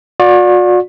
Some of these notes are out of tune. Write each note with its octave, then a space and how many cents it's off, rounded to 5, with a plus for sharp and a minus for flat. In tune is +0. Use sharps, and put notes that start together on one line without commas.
F#4 -45 D5 +0